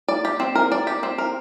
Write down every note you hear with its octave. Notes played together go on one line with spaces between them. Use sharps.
D5
G4
C4
A#4
D5
G4
C4
A#4